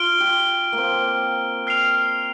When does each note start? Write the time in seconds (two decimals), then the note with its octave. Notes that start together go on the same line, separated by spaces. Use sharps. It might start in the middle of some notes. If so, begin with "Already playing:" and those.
Already playing: F4 F6 D7 G7
0.20 G4
0.73 A#3
0.78 C4
1.67 F6 C7 F7